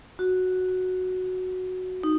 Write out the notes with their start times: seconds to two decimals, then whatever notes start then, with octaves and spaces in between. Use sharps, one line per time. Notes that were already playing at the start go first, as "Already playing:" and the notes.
0.19 F#4
2.03 D#4